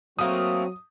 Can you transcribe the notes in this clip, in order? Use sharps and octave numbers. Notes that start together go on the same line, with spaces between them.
F#3 A3 A#3 C4 F#4 A#4 D#6